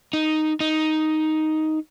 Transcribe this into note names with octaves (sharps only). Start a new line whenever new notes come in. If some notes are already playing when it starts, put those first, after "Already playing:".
D#4
D#4